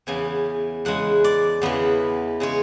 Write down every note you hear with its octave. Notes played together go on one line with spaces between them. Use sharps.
E2 C#3 E3 B3 G#5
E2 C#3 G#3 F#5
D5
E2 C#3 E3 B3
C#3 G#3 C#5